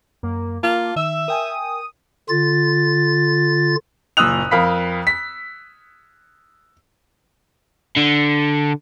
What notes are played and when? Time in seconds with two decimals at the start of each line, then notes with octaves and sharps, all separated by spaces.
0.23 F#2 A#3
0.63 A#3 F4 A5
0.96 D#3 E5 E6
1.28 A#4 G5 G#5 D#6
2.29 D3 F4 A6
4.17 F#1 A#2 D#6 E6 F#6 F7
4.51 F2 A#4 F5 B5 B6
5.07 B6
7.96 D3